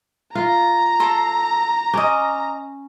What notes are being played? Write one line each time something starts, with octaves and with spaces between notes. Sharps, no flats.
F4 A#5
A4 A5 C6
C#4 D#5 D6